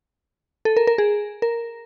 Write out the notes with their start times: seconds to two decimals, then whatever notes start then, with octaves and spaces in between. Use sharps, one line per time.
0.65 A4
0.77 A#4
0.87 A#4
0.98 G#4
1.42 A#4